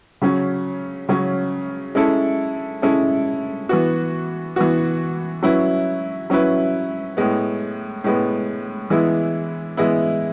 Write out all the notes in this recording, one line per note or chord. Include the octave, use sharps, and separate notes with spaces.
C#3 F#3 C#4
C#3 F#3 C#4
G#3 C#4 E4 A4
G#3 C#4 E4 A4
E3 B3 F#4
E3 B3 F#4
F#3 C#4 E4 B4
F#3 C#4 E4 B4
A2 G#3 B3
A2 G#3 B3
E3 G#3 B3 E4
E3 G#3 B3 E4